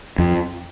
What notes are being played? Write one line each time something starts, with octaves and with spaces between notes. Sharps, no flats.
F2